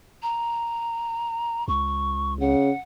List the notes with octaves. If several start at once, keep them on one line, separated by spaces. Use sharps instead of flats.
A#5
C#2 C#6
C#3 F#5